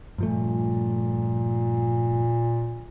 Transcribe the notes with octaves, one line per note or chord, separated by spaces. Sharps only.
G2 A#2 F3 A3